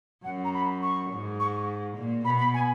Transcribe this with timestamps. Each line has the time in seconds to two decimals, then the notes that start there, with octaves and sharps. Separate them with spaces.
0.24 F#2 F#5
0.45 A#5
0.54 B5
0.82 C#6
1.11 G#2
1.40 C#6
1.96 A#2
2.25 B2 B5
2.39 B5
2.54 G#5